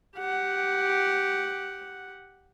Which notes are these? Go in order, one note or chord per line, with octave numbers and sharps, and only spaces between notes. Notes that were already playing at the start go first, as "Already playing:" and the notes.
G4 F#5